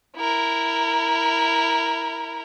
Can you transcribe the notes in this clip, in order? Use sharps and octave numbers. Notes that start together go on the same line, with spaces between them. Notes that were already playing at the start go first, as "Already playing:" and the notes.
E4 A#4